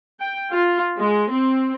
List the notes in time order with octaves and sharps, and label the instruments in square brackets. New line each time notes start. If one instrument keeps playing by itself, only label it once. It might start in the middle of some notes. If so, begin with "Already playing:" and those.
[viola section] G5
F4
G#3
C4